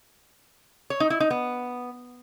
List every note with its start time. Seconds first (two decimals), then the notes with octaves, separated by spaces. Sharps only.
0.90 C#5
1.00 D#4
1.10 E4
1.20 D#4
1.30 B3